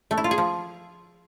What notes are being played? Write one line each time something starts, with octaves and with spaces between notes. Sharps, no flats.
A3
E4
F4
G#4
F3